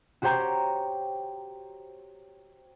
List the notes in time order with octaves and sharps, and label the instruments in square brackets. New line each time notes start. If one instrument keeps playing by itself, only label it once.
[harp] F#4 G4 C5 C#5 G5 A#5